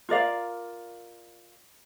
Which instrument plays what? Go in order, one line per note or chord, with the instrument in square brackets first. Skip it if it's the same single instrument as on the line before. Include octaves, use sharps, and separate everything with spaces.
[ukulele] F4 A#4 D5 F5